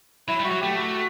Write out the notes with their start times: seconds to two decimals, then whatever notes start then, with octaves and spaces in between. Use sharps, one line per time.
0.28 F#3 E4
0.40 G3
0.44 F#4
0.51 F#3
0.60 A3 G4
0.76 F#4